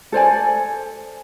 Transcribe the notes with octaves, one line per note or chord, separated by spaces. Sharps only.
A4 C5 D5 G#5